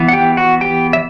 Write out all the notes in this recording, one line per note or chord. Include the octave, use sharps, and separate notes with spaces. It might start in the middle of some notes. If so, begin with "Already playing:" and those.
Already playing: E3 B3
F#5
G4 G5
F#4 F#5
G4 G5
E5